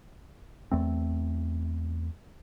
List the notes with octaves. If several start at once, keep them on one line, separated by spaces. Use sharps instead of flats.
E2 A3 C4